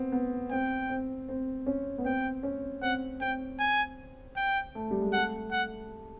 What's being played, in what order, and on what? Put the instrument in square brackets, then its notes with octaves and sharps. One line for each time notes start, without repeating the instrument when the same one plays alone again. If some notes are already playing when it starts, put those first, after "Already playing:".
Already playing: [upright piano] B3 C4
B3
[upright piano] C4 [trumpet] G5
[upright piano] C4
C4
C#4
B3
[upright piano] C4 [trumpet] G5
[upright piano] C#4
[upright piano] C4 [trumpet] F#5
[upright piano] C4 [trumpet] G5
[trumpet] G#5
G5
[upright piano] A3
G3
G#3
[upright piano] A3 [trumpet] F#5
[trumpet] F#5